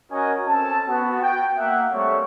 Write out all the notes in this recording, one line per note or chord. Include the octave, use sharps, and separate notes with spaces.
C#4 F#4 A#4 D#5 G#5
C4 C#4 A4 A5
B3 F#4
G5
A#3 E5 F#5
G3 A3 A#3 C4 C#5 C#6